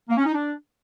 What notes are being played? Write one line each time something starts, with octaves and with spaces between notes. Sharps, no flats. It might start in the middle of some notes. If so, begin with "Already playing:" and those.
A#3
C#4
D#4
D4